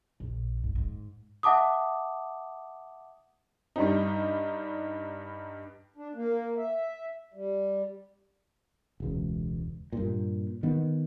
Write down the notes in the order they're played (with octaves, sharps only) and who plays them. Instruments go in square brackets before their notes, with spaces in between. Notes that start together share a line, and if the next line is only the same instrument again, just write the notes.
[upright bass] A#1
G#2
G#2
[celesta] E5 F#5 A5 D6 D#6
[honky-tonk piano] G2 G3 D#4
[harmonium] D4
A#3
E5
G3
[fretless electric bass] E1 C#2
G2 A#2
D#3 B3